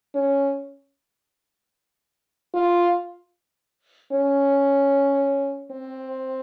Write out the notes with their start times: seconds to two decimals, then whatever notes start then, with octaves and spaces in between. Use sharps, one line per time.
0.15 C#4
2.54 F4
4.12 C#4
5.72 C4